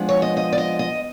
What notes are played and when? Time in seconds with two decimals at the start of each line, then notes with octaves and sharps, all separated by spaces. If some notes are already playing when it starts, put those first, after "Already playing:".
Already playing: F3 G#3 B3 D4
0.09 C#5
0.22 D#5
0.37 D#5
0.53 D5
0.58 D#5
0.79 D#5